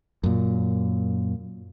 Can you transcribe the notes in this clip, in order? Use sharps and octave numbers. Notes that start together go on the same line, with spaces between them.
F#2 A#2